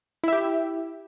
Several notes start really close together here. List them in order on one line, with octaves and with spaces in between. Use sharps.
E4 E5 G4